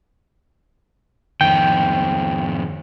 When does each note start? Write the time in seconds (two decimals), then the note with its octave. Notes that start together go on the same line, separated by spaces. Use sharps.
1.41 F2 D#3 G5